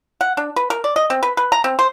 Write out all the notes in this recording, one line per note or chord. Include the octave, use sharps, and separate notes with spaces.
F#5
D4
B4
A#4
D5
D#5
C4
B4
B4
A#5
C4
C5